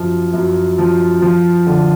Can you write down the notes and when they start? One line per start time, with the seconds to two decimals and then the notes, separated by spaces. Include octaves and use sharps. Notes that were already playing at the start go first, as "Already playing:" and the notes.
Already playing: F#2 F3
0.33 F#2
0.78 F3
1.22 F3
1.67 D3